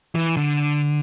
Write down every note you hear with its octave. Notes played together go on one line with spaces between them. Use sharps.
E3
D3